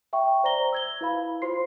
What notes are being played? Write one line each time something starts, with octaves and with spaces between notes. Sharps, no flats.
E5 G5 C#6
C5 D5 A#5 A#6 G7
E6 G#6 G7
E4 B4 F5 B5
F4 C5 C6 C7